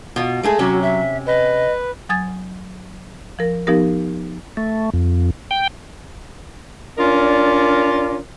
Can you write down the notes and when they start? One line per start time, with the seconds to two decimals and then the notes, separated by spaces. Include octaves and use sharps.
0.16 B2 F4
0.43 G#3 A3 G#4
0.59 C3 F#3 C#4 F#4
0.82 E5
1.26 B4 D#5
2.09 F#3 G#5 D#6 G#6 A6
3.39 F3 A#4
3.67 F3 B3 D#4 G4 A#4
4.57 A3
4.94 F2
5.51 G5
6.98 C#4 D4 F4 A#4 D5